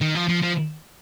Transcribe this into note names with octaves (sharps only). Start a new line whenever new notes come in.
D#3
F3
F3
F3